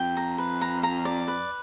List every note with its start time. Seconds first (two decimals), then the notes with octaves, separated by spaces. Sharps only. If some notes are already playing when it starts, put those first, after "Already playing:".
Already playing: F2 G5
0.17 A#5
0.38 B4
0.61 A#5
0.83 A#5
1.05 D5
1.28 B4